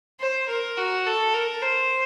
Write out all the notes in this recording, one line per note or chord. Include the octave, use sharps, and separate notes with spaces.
C5
A#4
F#4
A4
A#4
C5